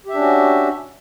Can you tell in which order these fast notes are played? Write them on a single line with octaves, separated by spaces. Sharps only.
G4 E5 D4 C#4 F#4